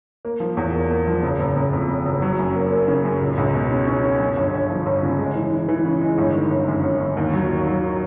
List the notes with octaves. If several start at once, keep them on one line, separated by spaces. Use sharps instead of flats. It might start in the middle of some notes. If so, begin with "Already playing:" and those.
A#3
F3
E2
A#3
A#3
F3
F#1
F#1
F#1
F2
F2
F#1
F#3
F#2
A#3
A#3
C#3
F#2
C#2
C#2
B2
C#4
C#4
C#4
F#2
G1
G1
F3
G1
C#3
G#3
E3
E3
E3
C#3
G#3
G1
D#3
G1
F#2
G1
G1
D#2
F#3
D#3
F#3
D#3